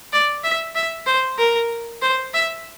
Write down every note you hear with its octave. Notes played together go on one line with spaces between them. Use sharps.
D5
E5
E5
C5
A#4
C5
E5